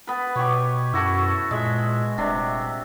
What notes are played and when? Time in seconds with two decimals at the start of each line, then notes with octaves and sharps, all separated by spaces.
0.07 B3 B4
0.36 B2 G4 C#5
0.93 F#2 E4 F#4 A4
1.51 A#2 G#3 E5
2.18 D#1 C3 D4